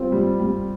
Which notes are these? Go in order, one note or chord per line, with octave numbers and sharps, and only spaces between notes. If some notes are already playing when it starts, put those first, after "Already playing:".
Already playing: G3 C4 F4
G3
G3